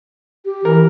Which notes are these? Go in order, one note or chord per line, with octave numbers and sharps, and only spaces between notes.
G4
E3 A#4